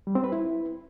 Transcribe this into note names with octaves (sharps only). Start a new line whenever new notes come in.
G3
C4
B4
E4